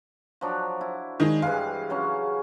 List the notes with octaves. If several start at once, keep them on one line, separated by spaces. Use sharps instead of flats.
F3 F#3 D4
E4
D#3 G#3 D#4
G2 E3 G#3 F5
C#3 F#3 C#4